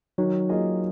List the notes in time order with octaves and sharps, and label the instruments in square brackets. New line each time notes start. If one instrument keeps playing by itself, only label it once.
[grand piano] D#3 [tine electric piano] F#3
[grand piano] A#3 F4 G#4 D#5